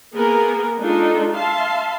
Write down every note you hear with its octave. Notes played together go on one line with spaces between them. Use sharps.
A#3 B3 G#4 A#4
G#3 D4 D#4 F4 A4
E5 F5 A5 C6